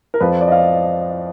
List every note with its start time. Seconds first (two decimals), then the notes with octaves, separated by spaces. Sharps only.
0.14 A#4
0.20 F2 F3 B4
0.41 D5
0.48 D#5
0.52 F5